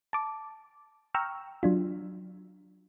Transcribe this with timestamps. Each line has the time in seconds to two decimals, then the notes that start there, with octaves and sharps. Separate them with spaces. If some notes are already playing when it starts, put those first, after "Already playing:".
0.13 A5 D6
1.14 G5 A#5 C#6 E6 F6
1.63 F#3 D4 F4